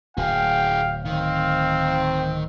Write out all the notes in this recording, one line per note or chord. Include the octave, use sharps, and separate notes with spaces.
D1 F#4 G#4 F5 G5
D#3 C4 F5